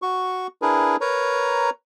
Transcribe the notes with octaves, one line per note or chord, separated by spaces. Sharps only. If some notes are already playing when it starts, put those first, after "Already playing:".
F#4 C#6
D4 E4 G#4 A#4 B4
A#4 B4 C#5 A#5